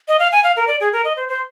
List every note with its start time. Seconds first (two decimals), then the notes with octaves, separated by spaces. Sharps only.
0.08 D#5
0.19 F5
0.32 G#5
0.44 F5
0.57 A#4
0.67 D5
0.80 G#4
0.93 A#4
1.05 D#5
1.17 C5
1.29 C5